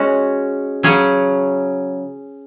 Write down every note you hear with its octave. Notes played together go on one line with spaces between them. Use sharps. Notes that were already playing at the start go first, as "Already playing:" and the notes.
Already playing: G#3 C#4 F#4 C#5
C#3 F#3 C#4 G#4 C#5